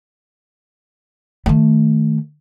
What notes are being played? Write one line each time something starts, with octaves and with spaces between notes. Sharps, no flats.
D#3 A3